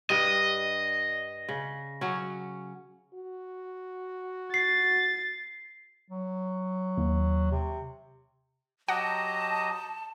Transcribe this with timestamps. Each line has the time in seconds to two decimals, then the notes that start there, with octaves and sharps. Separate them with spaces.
0.10 G2 G3 D4 D#5
1.49 C#3
2.01 F#3 C#4
3.14 F#4
4.54 A6 C7
6.09 F#3
6.98 D#2
7.51 C3
8.89 F#3 G4 D#5 F#5 A5 A#5